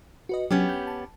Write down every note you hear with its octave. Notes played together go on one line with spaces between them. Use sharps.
F#4 B4 D#5
F#3 B3 C#4 G4
G6
A5